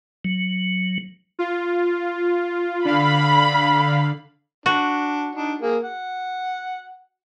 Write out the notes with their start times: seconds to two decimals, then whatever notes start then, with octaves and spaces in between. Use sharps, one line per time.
0.25 F#3
1.39 F4
2.85 D3 F5 B5
4.66 D4 F#4
5.35 D4 D#4
5.62 A#3 G#4
5.84 F#5